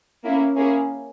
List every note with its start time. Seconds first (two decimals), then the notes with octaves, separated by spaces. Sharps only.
0.25 A#3 C#4 E4
0.57 A#3 C#4 E4 G#4